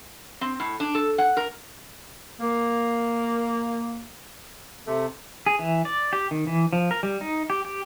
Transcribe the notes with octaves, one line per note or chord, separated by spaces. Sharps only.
C4
A2
D4
A4
F#5
A#4
A#3
C3 A3
G#4
E3
D5
G4
D#3
E3
F3
A#4
G3
D#4
G4
G4